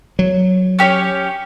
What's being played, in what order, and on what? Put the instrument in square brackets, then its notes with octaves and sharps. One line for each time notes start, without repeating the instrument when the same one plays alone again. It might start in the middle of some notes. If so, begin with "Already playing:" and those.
[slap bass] F#3
[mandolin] C#4 G4 C#5